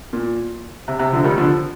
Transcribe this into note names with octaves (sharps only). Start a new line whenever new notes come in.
A#2
C3
C3
D3 F3
D#3 G3
D3 F3